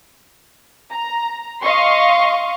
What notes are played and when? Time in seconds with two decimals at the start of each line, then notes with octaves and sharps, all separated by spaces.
0.92 A#5
1.61 D#5 F5 C6 C#6